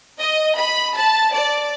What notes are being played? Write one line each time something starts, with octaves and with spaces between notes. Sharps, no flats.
D#5
B5
A5
D5